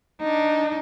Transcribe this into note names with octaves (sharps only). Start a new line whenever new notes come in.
D4 D#4